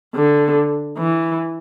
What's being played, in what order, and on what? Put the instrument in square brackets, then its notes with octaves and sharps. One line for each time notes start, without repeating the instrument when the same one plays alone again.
[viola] D3
E3